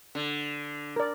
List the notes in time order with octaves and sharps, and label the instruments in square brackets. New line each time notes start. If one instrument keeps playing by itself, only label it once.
[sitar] D3
[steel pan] A#4 D5